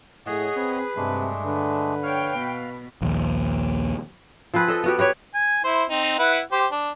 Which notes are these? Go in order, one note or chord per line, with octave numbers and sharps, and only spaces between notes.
A2 G#4 C#5 D#5 F#5
C4 B4
G2 C3 G#3 A3 D4
D3 B4
C#5 F5 G5 F6
B2
A#1 D#2
F3 C4 G#4 B4
A4 D#5
B3 F#4 G4
G4 B4 C#5
G#5
E4 C5
C4 D#4
E4 B4 F#5
G4 C5
D4